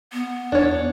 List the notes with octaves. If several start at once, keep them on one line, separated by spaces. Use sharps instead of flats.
B3
E2 D4 C#5